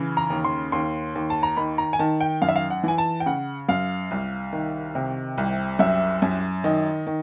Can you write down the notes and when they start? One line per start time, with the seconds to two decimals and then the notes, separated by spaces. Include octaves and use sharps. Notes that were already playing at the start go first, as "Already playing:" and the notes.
Already playing: C#3 E3
0.17 A#5
0.30 D#2
0.45 C6
0.72 D#2 C6
1.15 D#2
1.30 A5
1.43 A#5
1.57 D#3 B5
1.78 A#5
1.93 G#5
1.99 D#3 A5
2.21 G5
2.42 F#2 F5
2.49 E5
2.56 F5
2.70 F#5
2.84 E3 G#5
2.98 A5
3.20 G5
3.26 C#3 F#5
3.69 F#2 F5
4.11 C2
4.53 D#3
4.95 C3
5.38 C2
5.79 F#2 E5
6.22 F#2
6.64 D#3 D#5
7.07 D#3